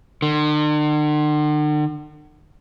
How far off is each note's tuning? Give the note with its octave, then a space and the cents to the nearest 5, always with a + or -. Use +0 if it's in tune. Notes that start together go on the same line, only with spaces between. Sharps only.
D3 +45